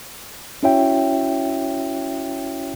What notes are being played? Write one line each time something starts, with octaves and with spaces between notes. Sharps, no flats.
C#4 E4 F#4 C#5 E5 G5